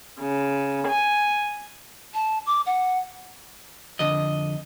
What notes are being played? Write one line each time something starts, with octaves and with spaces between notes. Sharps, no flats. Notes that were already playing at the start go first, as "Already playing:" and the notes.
C#3
G#5
A5
D6
F#5
F2 D3 D#5